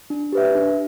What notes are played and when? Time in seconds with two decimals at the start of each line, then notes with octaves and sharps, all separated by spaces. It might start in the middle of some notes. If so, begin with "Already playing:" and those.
0.10 D4
0.32 G4 B4 E5
0.55 D4